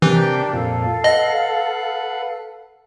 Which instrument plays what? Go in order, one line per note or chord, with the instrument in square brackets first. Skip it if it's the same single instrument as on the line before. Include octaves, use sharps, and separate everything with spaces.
[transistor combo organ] C3 G5 [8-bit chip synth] E3 [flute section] D4 G4 A#4
[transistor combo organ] F2 A#2 [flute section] A4 F5
[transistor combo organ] B4 F#5 [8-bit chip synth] D#5